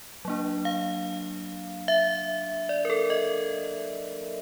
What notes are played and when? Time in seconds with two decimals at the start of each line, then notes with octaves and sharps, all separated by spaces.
0.25 F#3 A#3 D4
0.65 F5
1.88 E5
2.69 D5
2.85 A#4
2.90 A4
3.10 D#5